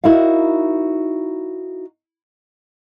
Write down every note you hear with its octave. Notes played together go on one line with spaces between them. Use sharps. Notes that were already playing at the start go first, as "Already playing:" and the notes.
D#4 E4 F#4 A#4 F5